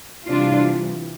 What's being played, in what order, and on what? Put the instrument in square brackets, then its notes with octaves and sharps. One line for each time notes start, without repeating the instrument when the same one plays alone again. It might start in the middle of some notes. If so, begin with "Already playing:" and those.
[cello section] C3 E3 G3 D4 F4